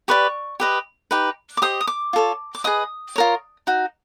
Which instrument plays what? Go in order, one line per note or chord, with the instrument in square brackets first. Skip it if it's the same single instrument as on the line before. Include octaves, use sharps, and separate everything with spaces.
[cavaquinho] G4 B4 D5 C#6
G4 B4 D#5
D#4 G4 B4
D6
G4 C5 D#5 D#6
D#6
D6
F4 A4 C#5
D6
G#4 B4 D#5 D#6
F4 A#4 C#5
D#4 F#4